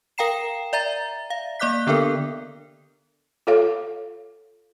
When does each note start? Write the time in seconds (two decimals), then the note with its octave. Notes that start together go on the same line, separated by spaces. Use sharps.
0.18 A#4 F5 G5 A#5 C7 E7
0.73 D5 E5 A#5 A6
1.30 F5
1.59 A#3 D5 D6 F#6 B6
1.87 D3 B3 D4 A4 A#4
3.47 F4 A4 C#5 F5